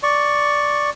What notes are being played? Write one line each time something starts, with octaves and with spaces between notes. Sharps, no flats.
D5 C#6